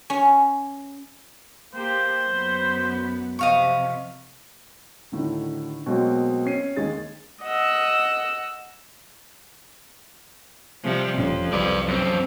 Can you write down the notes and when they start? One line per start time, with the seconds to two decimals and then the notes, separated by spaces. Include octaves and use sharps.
0.10 C#4
1.75 A#3 G4 C5
2.26 F#2 B3 B4
3.39 C3 F3 D#5 F5 C#6
5.12 D2 A2 D3 D#3
5.86 B2 F#3 G#3 A#3 C4
6.45 C#4 C7 D#7
6.76 D#2 G#3 G#4 A6
7.43 D#5 F#5 E6
10.83 C3 F3 G3
11.18 E1 F2 A#2 C#4
11.53 C2 G3 B4 D5
11.88 F#2 C4